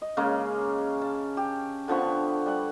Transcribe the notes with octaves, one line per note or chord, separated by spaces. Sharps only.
D#5
C#3 G#3 A#3 C#4
A5
G4
D3 F3 B3 C#6
G3 F#5